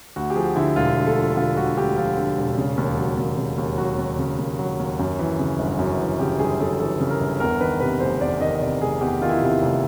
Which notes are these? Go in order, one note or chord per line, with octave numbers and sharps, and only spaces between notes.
D2 F#4
G4
F3 G#4
D3 E4
E1 F4
D2
A4
F3
D3 F4
E1 F#4
D2 G4
F3 F4
D3
E1
C#3
D#2
F#3
D#2
C#3
D#2
F#3 F#4
D#2
C#3
D#2
F#3
D#2
F#2
E3
C#3
G1
F#2
E3
C#3 G4
G1 G#4
F#2 A4
E3 A4
C#3
A#4
G1
E2 A#4
D#3 B4
C3 B4
F1 C5
E2 D5
D#3 D#5
D#5
C3 D5
F1 G#4
E2 G4
D#3 F4
E4
C3 E4
F1